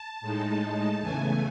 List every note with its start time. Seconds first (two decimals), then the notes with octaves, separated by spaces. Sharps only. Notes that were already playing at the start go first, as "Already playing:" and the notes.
Already playing: A5
0.21 A2 G#3 D#4
1.01 E2 C#3 E3 A3 G#5